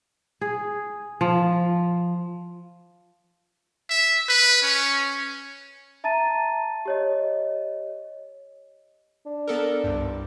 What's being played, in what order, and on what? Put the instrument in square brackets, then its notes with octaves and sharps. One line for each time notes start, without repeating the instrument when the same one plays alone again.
[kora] G#4
F3
[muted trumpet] E5
B4
C#4
[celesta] E5 A5 A#5 A6 D#7
G4 C#5 D#5
[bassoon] D4
[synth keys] B3 A4 A#4
C2 G2